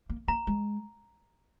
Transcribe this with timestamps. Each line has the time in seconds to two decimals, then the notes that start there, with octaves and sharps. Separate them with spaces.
0.09 A#3
0.28 A#3 A#5
0.47 G#3